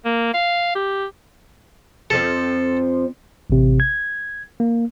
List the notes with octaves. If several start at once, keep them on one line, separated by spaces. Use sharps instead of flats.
A#3
F5
G4
F2 F3 C4 A4
A1 C3
G#6
A#3